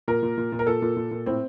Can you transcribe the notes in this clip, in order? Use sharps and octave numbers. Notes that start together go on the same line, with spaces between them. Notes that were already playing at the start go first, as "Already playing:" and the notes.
A#2 A#4
A#2
A#2
A#2
A#4
A#2 A4
A#2
A#2
A#2
A2 C4